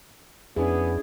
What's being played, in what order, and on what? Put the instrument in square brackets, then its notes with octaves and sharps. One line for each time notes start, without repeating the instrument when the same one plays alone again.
[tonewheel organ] F2 [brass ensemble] B3 [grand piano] C#4 D4 E4 [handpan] G#4